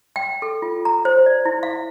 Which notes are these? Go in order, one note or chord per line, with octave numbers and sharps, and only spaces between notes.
G5
A4
F4
A#5
C5
D5
E4
F5